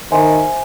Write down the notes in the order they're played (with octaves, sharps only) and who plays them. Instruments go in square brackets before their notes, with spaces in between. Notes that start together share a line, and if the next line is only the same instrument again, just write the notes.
[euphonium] D#3 [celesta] C5 E5 G#5 C6